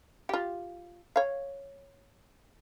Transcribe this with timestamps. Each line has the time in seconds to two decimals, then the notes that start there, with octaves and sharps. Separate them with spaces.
0.29 F4 G4
1.16 C#5 F5